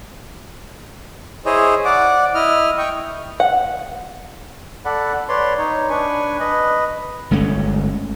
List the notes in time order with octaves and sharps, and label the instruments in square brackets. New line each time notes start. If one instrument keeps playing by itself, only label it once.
[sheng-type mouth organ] E4 G#4 C5 C#5 D#5
D5 F#5 D6
E4 D#5 F6
D#5 G5 C#6
[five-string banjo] F#5
[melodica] A4 D5 F#5 B5
B4 C#5 D5 C6
D#4 C#5
D4 B4 G#5 C#6
B4 D#5
[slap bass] G1 G#3 A3 C#4